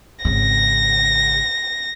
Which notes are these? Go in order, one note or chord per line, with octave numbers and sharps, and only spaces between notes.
G#1 C#3 A#6